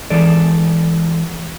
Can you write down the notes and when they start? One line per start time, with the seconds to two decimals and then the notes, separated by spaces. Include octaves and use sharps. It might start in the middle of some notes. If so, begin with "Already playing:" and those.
0.10 E3 G#3 A4 D5